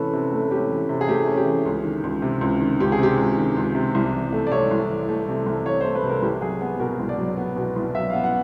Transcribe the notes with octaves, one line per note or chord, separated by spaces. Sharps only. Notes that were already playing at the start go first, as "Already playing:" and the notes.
Already playing: C3 E3 A3 C#4 A4 B4
C3
A3
C#4 G4
E3
C3
G#4
A3 G4
C#4
G4
E3
C#2
D#3
C#2
C3
C#2
D#3
C#2 G4
G#4
C3 G4
C#2
D#3
C#2
C3
C2
E3
A3
D5
C3 C#5
C2
E3
A3
C3
C2
E3 C#5
A3 C5
B4
C3
A#4
C2 G4
F#3 G#4
B3
B2 A#4
C2
D5
F#3
B3
B2
C2
F#3 E5
B3 F5
F#5